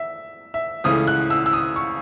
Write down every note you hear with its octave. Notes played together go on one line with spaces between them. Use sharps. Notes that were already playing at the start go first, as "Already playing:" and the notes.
Already playing: E5
E5
C#2 C#3 E3 A3 D#6
F#6
E6
E6
D#6
C#6